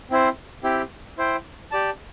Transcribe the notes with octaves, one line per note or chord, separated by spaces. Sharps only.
C4 E4 C5
C4 E4 G4
E4 C5 G5
G4 D5 A5